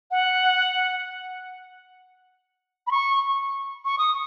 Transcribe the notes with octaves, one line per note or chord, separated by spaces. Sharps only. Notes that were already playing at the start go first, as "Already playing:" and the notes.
F#5
B5
C#6
C#6
D#6